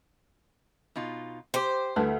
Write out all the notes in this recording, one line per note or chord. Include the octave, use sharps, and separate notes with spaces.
B2 D#4 F4
G4 C5 G5
D2 E4 A4 B4 A5